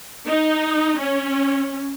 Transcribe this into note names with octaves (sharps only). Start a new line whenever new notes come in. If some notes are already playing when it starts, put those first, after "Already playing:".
D#4
C#4